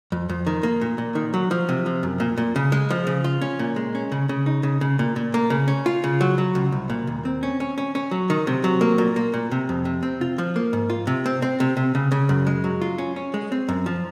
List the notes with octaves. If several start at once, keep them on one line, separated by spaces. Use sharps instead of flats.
F2
F2
D#3
A#3
A#2
A#2
D#3
F#3
F3
C3
F3
F#2
A#2
A#2
C#3
G#3
F3
C#3
F4
C#4
A#2
G#3
C#4
C#3
C#3
D#4
C#3
C#3
A#2
A#2
A#3
C#3
C#4
F4
C#3
F#3
F#3
C#2
C2
A#2
D#2
C4
C#4
C#4
C#4
C#4
F#3
D#3
C3
F#3
A#3
A#2
A#3
A#2
C3
F2
C3
C4
F4
F3
A#3
G#2
F4
C3
C4
C4
C3
C3
C#3
C#3
F#2
G#3
F#3
F4
C#4
C#4
G#3
C4
F#2
F3